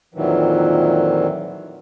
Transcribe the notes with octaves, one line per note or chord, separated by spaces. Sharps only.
F2 A#2 D#3 E3 F#3